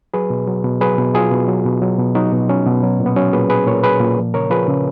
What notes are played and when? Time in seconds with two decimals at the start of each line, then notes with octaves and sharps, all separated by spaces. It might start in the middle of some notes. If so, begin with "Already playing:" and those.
0.14 F#3 G#4 B4
0.30 B2
0.47 F#3
0.64 B2
0.81 F#3 G#4 B4
0.98 B2
1.14 F#3 F4 G#4
1.32 B2
1.48 F#3
1.65 B2
1.82 F#3
1.98 B2
2.15 F#3 D#4 F#4
2.32 B2
2.49 F#3 C#4
2.66 B2
2.83 F#3
3.00 A#2
3.06 B3
3.16 F#3 C#4
3.33 A#2 G#4 B4
3.50 F#3 G#4 B4
3.67 A#2 A#4 C#5
3.83 F#3 G#4 B4
4.00 A#2
4.17 F3
4.34 C#3 A#4 C#5
4.50 F3 G#4 B4
4.68 C#3